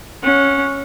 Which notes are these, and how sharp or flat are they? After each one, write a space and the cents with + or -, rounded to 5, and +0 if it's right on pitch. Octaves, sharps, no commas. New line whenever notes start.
C#4 +0 F#5 -25